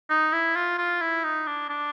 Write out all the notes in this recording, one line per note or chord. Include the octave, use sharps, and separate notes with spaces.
D#4
E4
F4
F4
E4
D#4
D4
D4